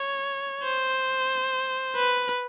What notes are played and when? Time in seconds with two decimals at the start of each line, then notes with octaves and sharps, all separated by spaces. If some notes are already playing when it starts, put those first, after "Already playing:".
Already playing: C#5
0.63 C5
1.96 B4